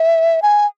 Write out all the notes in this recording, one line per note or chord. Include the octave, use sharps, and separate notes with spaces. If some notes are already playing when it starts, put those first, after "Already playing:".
Already playing: E5
G#5